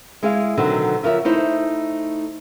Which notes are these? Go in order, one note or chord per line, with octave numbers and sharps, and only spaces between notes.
G#3 E4 G#4 F5
B2 D3 D#3 F#3 C4
C#3 F3 A#4 E5
A3 D#4 E4 C5